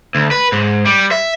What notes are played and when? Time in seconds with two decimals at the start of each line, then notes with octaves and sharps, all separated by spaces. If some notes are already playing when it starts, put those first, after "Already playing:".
0.15 D2
0.31 B4
0.52 G#2
0.86 G3
1.11 E5